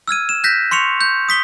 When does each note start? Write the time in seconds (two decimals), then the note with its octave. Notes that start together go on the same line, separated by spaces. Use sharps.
0.08 E6 F6 G#6 D#7
0.29 E7
0.44 F#6 G6 A#6 B6
0.71 C6 C#6 C#7 F7
1.01 G6
1.29 D#6 B6 G7